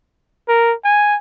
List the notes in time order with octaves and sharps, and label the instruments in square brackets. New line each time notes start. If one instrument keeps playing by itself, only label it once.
[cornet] A#4
G#5